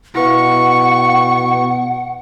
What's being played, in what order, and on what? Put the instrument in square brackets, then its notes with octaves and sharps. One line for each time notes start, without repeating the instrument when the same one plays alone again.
[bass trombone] B2 [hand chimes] E4 B4 F5 [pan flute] F#5 [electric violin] C#6